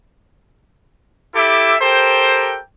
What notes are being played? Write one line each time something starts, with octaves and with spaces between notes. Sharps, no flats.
E4 G4 A4 E5 D6
G4 A4 A#4 C5 G5